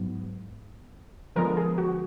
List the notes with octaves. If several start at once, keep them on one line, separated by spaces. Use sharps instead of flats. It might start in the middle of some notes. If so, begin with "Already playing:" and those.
Already playing: G#2 F#3 B3
D3 F3 G#3 B3 A#4
G#4
F#4